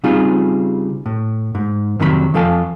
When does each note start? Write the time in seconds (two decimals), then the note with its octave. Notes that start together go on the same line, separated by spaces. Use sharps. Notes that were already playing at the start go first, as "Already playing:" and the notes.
0.04 C#3 G3 C4 D#4 F4 G#4
1.06 A2
1.55 G#2
2.00 F2 C3 D#3 F#3 F4 B5
2.34 F2 F3 A4 F5 G#5 A5